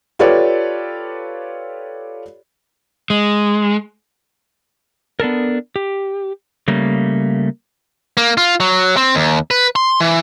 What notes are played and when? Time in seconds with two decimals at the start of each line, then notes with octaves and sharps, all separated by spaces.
0.19 F4 G4 A4 B4 C#5 D5
3.10 G#3
5.20 B3 D4 A4 A#4
5.76 G4
6.68 C#3 G3 A3 A#3
8.17 A#3
8.37 F4
8.60 F#3
8.97 C4
9.15 D#2
9.51 B4
9.76 C6
10.00 E3